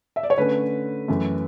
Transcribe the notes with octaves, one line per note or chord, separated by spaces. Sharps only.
E5
D5
C#5
D3 A3 C#4 B4
F#2 E3 A3